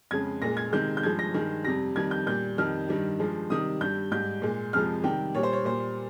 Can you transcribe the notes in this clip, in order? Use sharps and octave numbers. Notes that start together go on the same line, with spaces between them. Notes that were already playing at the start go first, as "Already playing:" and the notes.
F2 C#3 G#3 G#6
A#2 G#3 A#6
G#6
C3 D#3 G#3 G6
G6
G2 F3 G#3 G#6
A#6
G2 D#3 G#3
F2 C3 G3 A#6
F2 D#3 G3 G#6
G6
A#2 G3 G6
F2 D#3 G3 F6
G2 D#3 G3
G2 F3 G#3
C3 D#3 G3 D#6
G2 G3 G6
G#2 G3 G6
A#2 G#3
F2 C3 F3 G#3 F6
C3 D#3 G3 G5
A#2 G3 C#5
C5
C#5
A#2 G3 C5